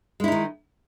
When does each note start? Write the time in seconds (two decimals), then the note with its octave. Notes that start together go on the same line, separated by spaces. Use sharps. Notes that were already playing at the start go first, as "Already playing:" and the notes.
0.20 G#3
0.24 E4
0.28 D#4
0.32 D#3